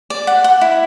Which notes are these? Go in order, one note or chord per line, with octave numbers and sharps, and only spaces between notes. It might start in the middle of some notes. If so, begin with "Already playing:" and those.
D5
F#5
F#5
E4